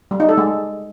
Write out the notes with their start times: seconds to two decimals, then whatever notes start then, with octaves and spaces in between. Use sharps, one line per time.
0.11 G3
0.20 D#4
0.29 A4
0.38 G#3